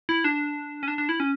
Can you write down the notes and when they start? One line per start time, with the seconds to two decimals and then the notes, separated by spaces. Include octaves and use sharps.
0.09 E4
0.24 D4
0.83 C#4
0.88 D4
0.98 D4
1.09 E4
1.20 C#4